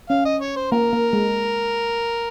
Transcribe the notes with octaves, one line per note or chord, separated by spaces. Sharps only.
C#4 F5
D#5
C#5
C5
A#3 A#4
A#3
G#3